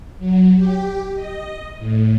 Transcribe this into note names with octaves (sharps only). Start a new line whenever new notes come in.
F#3
G4
D#5
A2